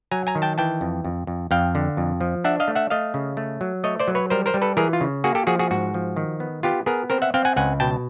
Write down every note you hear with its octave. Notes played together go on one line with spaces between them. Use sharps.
F#3 G#5 A#5
G#5 A#5
D#3
G5 A5
E3 G5 A5
F2
F2
F2
F2 F5 G5
D3
F2
F3
D4 E5 F#5
D#5 F5
A3
E5 F#5
A3 D#5 F5
C#3
A3
F#3
A3 C#5 D#5
C5 D5
F#3
B4 C#5
G3 A#4 C5
A#4 C5
G3
A4 B4
E3 G#4 A#4
F4
C#3
A#3 F#4 G#4
G4 A4
F3 F#4 G#4
F#4 G#4
G#2 F#4
F3
D#3
B3
B3 F4 G4
B3 G#4 A#4
C4 A#4 C5
E5 F#5
C4 F5 G5
F#5 G#5
C#2 F#5 G#5
B2 G5 A5